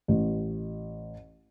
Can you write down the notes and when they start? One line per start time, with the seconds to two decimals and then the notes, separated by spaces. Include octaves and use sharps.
0.08 A1